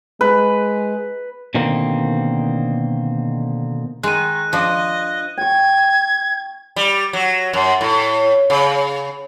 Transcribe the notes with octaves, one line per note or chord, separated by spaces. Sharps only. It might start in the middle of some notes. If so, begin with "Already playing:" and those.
G#3 B4
B2 D3 D#3 A#3 C4
D#3 G#3 F#6 D#7
F3 D4 D#5
G5 C#6 G#6
G3
F#3
F#2
A2
C#3